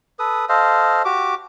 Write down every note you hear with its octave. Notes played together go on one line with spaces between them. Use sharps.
A4 B4 D#6
A4 C5 D#5 F5
F#4 G4 D6